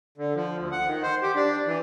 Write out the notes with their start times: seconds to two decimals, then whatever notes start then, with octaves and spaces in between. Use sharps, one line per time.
0.18 D3
0.35 F3
0.58 D2
0.72 F#5
0.87 D#3
1.03 C5
1.22 G4
1.35 D4
1.67 E3